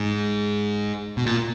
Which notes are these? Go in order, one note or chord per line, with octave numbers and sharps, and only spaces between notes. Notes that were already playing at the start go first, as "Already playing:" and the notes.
Already playing: G#2
B2
A#2